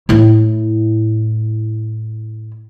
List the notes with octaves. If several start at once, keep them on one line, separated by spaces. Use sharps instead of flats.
A2 E4